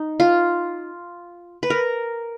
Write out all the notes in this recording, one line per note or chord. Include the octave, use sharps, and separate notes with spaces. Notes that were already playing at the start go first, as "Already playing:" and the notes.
Already playing: D#4
F4
B4
A#4